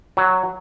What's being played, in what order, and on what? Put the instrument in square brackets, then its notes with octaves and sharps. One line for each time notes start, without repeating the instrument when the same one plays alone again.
[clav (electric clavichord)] F#3